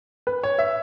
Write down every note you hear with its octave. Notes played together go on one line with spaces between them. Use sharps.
B4
C#5
E5